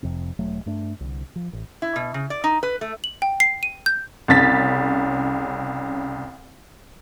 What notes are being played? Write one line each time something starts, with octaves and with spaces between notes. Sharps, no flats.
F1 F2 C3
E1 F#3 A3
G2 A3 D4
C2 D3
F3
A1
E4
B2
C#3
D5
D#4
B4
A3
F#7
G5
C7
D#7
G6
C2 C#3 A6 B6